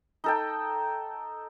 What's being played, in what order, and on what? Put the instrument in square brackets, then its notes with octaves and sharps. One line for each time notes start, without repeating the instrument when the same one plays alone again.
[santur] D#4 A4 G5